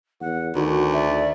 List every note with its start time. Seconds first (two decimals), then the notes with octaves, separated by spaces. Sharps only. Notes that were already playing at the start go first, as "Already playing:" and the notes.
0.21 E2 F#5
0.56 D2 D#3 F#4
0.93 D5 E5